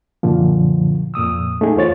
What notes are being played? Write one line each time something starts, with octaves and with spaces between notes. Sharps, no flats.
F#2 A#2 D3 F3
F2 A#2 D#6 E6
A3 D#4 G#4
E2 F4 C5 C#5 A6